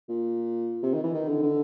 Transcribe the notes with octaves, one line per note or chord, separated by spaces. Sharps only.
A#2
C3
D#3
E3
D#3
D3
D3